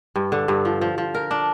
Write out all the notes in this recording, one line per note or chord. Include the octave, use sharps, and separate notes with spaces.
G2
D3
G2
F3
F3
F3
A#4
D4